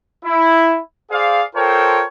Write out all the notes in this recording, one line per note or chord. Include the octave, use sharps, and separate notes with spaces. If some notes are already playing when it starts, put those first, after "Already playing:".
E4
G#4 C5 D5 F5
F4 A4 A#4 C5 C#5 G5